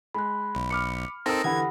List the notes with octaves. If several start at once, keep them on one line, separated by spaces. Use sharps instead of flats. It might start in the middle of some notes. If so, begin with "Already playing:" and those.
G#3 B5 F#6
B1 B5
B5 D6 F6 C#7
C4 D#4 A4 A#4 D#6 A#6
D3 E3 G4 F#5 B5 G#6